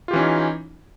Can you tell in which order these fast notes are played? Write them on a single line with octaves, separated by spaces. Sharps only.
F4 G4 E3 C#4 D#4